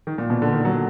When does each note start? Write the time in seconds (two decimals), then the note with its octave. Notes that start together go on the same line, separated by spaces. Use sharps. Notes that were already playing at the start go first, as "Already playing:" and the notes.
0.07 D#3
0.18 A#2
0.30 B2
0.42 D3
0.53 D#3
0.65 F#3